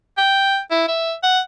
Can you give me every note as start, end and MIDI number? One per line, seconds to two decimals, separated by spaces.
0.18 0.59 79
0.71 0.84 64
0.88 1.14 76
1.23 1.40 78